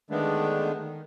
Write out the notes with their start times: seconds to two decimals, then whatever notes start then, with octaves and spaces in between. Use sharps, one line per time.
0.10 D3 D#3 G#3 A3 B3 D4
0.76 D#3